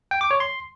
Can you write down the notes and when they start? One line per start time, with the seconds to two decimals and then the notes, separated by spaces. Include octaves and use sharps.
0.11 G5
0.21 D6
0.31 C#5
0.40 C6